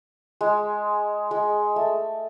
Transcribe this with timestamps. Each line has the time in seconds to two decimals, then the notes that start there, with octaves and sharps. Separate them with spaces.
0.41 G#3
1.31 G#3
1.76 A3